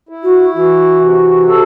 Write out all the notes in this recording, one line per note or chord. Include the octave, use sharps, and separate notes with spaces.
E4
F#4
E3 F#4
C3
A4